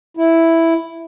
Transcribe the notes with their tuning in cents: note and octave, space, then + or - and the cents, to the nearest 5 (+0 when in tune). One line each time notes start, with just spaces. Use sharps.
E4 +0